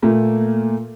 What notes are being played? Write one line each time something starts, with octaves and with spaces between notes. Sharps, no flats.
A#2 A3 A#3